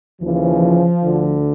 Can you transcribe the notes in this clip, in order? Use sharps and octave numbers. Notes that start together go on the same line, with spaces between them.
D#2 C#3 E3 F3
D2 D3